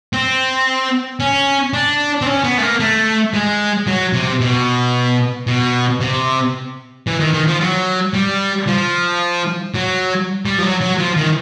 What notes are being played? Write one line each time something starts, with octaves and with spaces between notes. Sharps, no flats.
C4
C#4
D4
C4
C#4
B3
A3
A#3
A3
G#3
F#3
C3
B2
B2
C3
E3
D#3
D#3
F3
F#3
G3
F3
F#3
G3
F3
F#3
F#3
F3
D#3